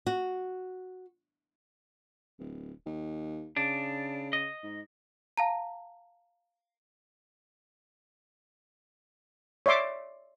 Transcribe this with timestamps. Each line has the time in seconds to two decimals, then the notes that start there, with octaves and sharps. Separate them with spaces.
0.07 F#4
2.39 D1
2.86 D#2
3.57 C#3 D4
4.33 D#5
4.63 G#2
5.37 F5 A5 A#5
9.66 C#5 D5 E5 C6 D6